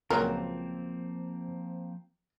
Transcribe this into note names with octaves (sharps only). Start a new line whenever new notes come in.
C#2 A#2 F3 F#3 A#3 C4 A#4